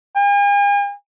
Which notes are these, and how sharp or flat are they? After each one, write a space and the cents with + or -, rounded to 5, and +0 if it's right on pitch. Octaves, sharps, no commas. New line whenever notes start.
G#5 -45